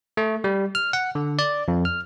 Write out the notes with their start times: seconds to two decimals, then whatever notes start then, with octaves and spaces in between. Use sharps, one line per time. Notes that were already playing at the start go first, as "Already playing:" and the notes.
0.17 A3
0.44 G3
0.75 F6
0.93 F#5
1.15 D3
1.39 D5
1.68 F2
1.85 F6